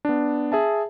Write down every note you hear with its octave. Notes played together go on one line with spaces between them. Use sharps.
B3 D4
G#4 E5 A5